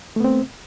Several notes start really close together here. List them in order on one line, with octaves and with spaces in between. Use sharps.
A3 B3 C4